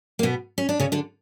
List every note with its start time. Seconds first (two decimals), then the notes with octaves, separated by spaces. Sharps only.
0.19 A#3
0.23 B2 B3
0.58 C#4
0.69 D4
0.80 C#3 C#4
0.92 D3 D4